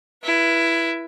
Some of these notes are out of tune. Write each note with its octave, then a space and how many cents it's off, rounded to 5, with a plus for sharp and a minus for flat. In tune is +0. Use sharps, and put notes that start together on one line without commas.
E4 +15 B4 -25